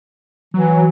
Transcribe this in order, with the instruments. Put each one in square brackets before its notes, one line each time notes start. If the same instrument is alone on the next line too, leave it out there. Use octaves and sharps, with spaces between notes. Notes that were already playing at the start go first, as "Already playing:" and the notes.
[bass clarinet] E3 [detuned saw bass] F#3